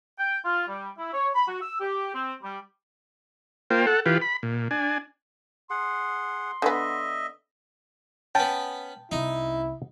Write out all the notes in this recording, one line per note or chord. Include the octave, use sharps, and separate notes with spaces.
G5
F4
G3
E4
C#5
B5
F#4
E6
G4
C4
G3
A#3 F4 C5 G5
A4 F#5
E3 F4 G4 B4
B5
A#2
D4 G#5
G#4 F#5 C6
D3 B3 D#5 E5
B3 C#4 G5 A5
C2 C#4 D#4 E4